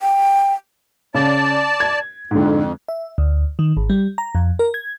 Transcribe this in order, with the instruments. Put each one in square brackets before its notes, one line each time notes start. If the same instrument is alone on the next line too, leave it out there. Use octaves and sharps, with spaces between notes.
[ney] G5
[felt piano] C#3 [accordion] D5 A5
[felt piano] G#6
[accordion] F2 [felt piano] G#2 D3
[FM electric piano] E5
D2
D#3
G#1
G3
A#5
F2
A#4
G#6